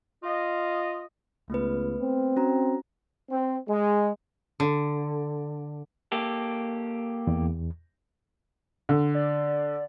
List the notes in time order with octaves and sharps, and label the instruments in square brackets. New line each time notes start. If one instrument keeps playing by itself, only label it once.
[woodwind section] F4 D#5
[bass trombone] C#2 [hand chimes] A3 B3 B4
[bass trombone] C4
[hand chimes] C#4 F#4 A#5
[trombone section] C4
G#3
[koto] D3
[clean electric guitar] A#3 G4 A4
[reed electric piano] E2
[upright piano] D3
[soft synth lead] D5